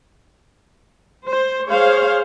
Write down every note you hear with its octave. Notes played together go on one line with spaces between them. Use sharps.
C5
G#4 C5 C#5 F5